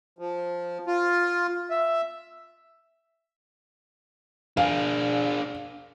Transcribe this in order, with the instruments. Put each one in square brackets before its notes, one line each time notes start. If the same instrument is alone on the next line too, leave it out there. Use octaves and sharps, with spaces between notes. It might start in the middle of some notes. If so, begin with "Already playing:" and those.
[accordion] F3
F4
E5
[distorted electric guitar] D4 G#4 [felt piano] F5